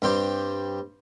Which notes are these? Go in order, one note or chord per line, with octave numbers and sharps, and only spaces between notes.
G2 G3 C4 G4